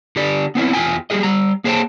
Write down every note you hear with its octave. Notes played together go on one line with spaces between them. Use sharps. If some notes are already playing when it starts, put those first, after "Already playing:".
D3 G4 D5
B3 C4 E4 C#5
E2 A#2 F4 G5 G#5
G3 G4 G#4 D#5
G3 A#5
A#3 G#4 C5 C#5 G5 A5